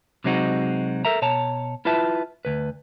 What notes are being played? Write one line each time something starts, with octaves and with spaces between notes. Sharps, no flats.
C3 F#3 G#3 C4 D#4 F#4
A4 A#4 E5 A#5
B2 C#5 A5 A#5
E4 F4 B4 E5 A5
D2 B4